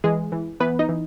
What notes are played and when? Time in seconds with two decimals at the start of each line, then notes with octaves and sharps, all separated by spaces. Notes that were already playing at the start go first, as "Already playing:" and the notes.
0.04 E3 G#3 G#4
0.32 E3
0.60 E3 B3 B4
0.79 D#4 D#5
0.89 E3